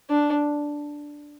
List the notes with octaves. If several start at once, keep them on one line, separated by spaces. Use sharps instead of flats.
D4